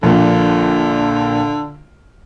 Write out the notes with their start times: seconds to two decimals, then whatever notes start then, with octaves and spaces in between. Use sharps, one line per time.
0.03 A#1 A#2 D3